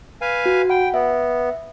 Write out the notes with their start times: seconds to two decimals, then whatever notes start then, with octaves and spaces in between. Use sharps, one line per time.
0.21 B4 F5 G#5
0.46 F#4
0.70 F#5 G5 B5
0.94 B3 E5